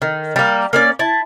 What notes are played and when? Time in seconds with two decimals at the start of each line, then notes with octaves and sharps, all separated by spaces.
0.02 D#3
0.36 G3 A#3
0.73 A#3 C#4 D5
0.99 E4 A5